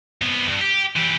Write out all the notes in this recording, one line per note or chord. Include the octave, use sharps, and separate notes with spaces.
C2 B3
G2
G4
E3 G4